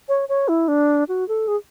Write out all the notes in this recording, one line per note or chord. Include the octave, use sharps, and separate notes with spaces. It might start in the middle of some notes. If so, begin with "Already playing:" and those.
C#5
C#5
E4
D4
F#4
A4
G#4